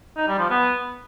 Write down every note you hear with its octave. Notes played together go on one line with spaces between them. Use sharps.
D#4
G3
F3
B3